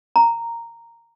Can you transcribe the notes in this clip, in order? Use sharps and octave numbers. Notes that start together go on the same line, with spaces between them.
A#5